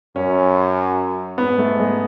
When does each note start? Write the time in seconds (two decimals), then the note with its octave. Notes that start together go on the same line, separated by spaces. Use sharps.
0.16 F#2 C#4
1.38 G#2 B3
1.58 A3
1.79 G#3